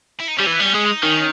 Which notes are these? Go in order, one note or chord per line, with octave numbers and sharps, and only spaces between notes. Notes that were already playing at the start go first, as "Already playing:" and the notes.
E4
D#4
G3 C#4
E3 B3
G3
C#4
G#3
D#4
D#3 C#4